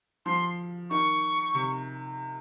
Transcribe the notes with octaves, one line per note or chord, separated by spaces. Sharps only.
F3 C6
D#3 C#6
C3